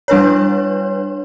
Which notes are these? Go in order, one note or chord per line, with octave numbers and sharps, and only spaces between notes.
G3 D4 B4 C#5